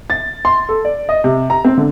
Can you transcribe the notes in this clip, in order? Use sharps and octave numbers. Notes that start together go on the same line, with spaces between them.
A6
C6
A4
D5
D#5
C3
A#5
C4
D3